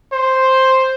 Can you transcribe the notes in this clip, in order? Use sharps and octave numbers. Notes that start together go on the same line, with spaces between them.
C5